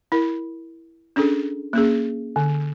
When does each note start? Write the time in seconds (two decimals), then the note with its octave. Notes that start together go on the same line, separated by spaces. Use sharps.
0.12 E4 A#4
1.16 C#4 D4 G#4 A4
1.73 A#3 C#4 G#4
2.36 D3